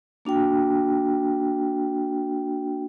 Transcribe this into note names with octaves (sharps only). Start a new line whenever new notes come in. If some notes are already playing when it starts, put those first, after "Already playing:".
A#3 D4 F#4 G5